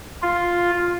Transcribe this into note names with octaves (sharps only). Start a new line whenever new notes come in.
F4